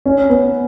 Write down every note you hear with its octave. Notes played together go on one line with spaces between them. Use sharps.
C#4
B3